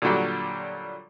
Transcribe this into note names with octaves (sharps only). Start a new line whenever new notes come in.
A#2 D3 F#3 G3